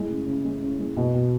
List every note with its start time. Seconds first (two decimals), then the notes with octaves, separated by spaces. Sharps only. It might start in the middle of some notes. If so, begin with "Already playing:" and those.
Already playing: A2 G#3
0.10 C#3
0.27 C#3
0.44 G#3
0.62 C#3
0.79 G#3
0.97 B2
1.14 B2